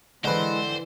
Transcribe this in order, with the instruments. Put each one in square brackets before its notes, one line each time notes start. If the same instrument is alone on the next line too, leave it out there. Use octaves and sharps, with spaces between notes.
[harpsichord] D3 C4 [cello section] E3 [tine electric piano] G#3 B4 [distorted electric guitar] C5